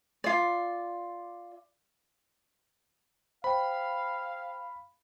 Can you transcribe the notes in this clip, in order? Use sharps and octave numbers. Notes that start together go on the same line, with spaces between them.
F4 D5
C5 F5 G5 B5